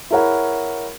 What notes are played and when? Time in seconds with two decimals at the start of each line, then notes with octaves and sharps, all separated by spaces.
0.10 E4 G#4 A#4 C#5 F#5 B5